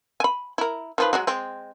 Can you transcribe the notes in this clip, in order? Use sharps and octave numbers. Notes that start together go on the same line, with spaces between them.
G#5 B5
E4 A#4
D#3 F3 B4
F#3 G#3 F#4
G#3 C4